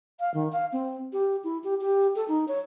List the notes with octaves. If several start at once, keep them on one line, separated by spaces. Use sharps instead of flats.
F5
D#3
F5
C4
G4
E4
G4
G4
A4
D#4
C#5